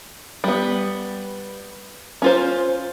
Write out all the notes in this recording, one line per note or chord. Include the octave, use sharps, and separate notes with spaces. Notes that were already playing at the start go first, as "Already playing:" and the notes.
G3 B3
C#4 F4 C5